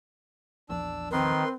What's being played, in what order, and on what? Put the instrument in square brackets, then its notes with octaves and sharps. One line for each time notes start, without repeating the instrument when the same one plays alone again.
[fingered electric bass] A#1 E2 F3 [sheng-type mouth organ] D4 E6
[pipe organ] D#3 [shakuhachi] C4 [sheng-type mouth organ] B4 C6